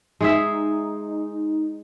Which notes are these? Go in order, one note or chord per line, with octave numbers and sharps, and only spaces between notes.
G#3 D#4 G#4 E5